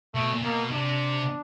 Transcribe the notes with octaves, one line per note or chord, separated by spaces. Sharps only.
B2 A3
A#2
B2 A#3
C3 D4